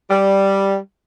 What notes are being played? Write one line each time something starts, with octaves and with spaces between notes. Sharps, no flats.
G3